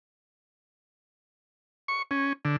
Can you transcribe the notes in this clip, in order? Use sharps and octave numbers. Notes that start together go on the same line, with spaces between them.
C#6
C#4
D3